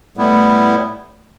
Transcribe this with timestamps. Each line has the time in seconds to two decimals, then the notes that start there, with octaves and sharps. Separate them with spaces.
0.17 A2 G3 A3 B3 E4